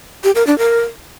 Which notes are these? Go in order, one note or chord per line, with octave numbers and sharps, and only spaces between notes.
G4
A#4
D4
A#4